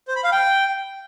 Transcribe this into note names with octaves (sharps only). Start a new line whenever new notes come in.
C5
B5
F5
G5